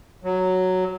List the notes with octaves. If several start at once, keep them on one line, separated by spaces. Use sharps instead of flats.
F#3